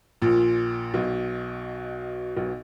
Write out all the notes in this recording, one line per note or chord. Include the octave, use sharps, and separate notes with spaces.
A#1 A#2
B1 B2
B1 B2